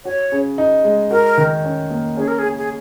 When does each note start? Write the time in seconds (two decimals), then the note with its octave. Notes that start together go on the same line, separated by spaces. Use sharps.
0.05 F#4 C#5
0.32 C#3
0.58 D#4
0.84 G#3
1.11 F#4 A#4
1.38 D#3
1.64 C#4
1.90 A#3
2.17 C#4 G#4
2.28 A#4
2.39 G#4
2.43 C#3
2.58 G#4